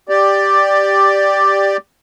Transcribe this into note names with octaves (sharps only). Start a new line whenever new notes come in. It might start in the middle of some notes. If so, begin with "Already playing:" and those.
G4 D5